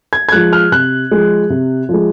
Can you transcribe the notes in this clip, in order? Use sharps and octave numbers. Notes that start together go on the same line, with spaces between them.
G#6
G#6
F3 G#3 F#6
F6
C3 F#6
F3 G#3
C3
F3 G#3